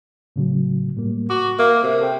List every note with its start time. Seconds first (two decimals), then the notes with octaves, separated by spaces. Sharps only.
0.36 A2 C#3 F#3
0.97 A2 G3 A#3
1.30 F#4 D6
1.59 A#3 E5
1.83 C3 E5
2.01 A4 C5 G5